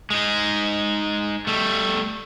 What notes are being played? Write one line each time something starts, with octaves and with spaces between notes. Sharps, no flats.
G#3 D#4
G3 A3